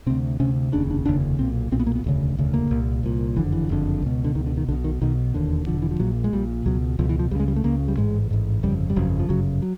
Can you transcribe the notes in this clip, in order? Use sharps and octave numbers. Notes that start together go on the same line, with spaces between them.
D2 C3 C4
D2 C3 C#4
F1 D#2 C#3 D4
D4
F1 D#2 C#3 D4
B1 A#2 C4
B1 A#2 C4
B3
A#3
B3
E1 D2 C#3
E1 D2 C#3
A#3
C2 A#2
C2 A#2
F#1 F2 D3 E3
E3
F#1 F2 D3
C#2 B2
D3
C#2 B2 D#3
D3
D#3
B1 B2 D3
D#3
B1 B2 D#3
E1 D#2 D3
E1 D#2 D3 F3
E3
F3
A#1 A#2 F#3
G#3
A#1 A#2 G3
C#2 B2 F#3
C#2 B2 F3
E3
F3
C#2 C#3 G3 G#3
G3
A3
C#2 C#3 A#3
G3
A1 G#2 G#3
A1 G#2
G1 F2 C#3 G3
G3
G1 F2 C#3 F#3
F3
G1 F#2 C#3 F#3
F#3